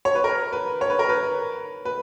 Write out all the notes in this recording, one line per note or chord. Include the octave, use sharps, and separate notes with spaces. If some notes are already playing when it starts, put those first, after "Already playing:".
C#5
B4
A#4
B4
C#5
B4
A#4
B4
B4